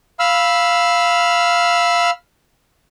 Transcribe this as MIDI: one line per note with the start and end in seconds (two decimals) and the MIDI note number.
0.19 2.10 77
0.19 2.10 83
0.19 2.10 88
0.19 2.10 89